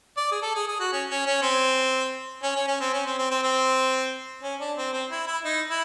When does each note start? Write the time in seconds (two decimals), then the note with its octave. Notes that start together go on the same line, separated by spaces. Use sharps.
0.17 D5
0.31 G#4
0.42 A4
0.55 G#4
0.68 G#4
0.80 F#4
0.92 C#4
1.09 C#4
1.26 C#4
1.42 C4
2.43 C#4
2.56 C#4
2.67 C#4
2.80 C4
2.93 C#4
3.06 C4
3.18 C4
3.31 C4
3.43 C4
4.43 C#4
4.60 D4
4.77 C4
4.93 C4
5.11 E4
5.27 E4
5.44 D#4
5.69 E4